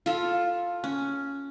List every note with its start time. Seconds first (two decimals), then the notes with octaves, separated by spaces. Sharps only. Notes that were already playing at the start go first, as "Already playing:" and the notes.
0.06 F4 A4
0.84 C#4